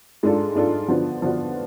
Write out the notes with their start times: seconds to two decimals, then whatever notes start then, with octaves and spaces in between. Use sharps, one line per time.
0.23 G#2 G#3 D4 F4 A4
0.55 G#2 G#3 D4 F4 A4
0.88 D3 F3 B3 D4 F#4
1.22 D3 F3 B3 D4 F#4